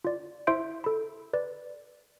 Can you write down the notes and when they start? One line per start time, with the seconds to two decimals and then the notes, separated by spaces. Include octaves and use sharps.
0.04 F4 D5
0.47 E4 C5 E5 C6 G6 D7
0.84 A4 B5
1.33 B4 D5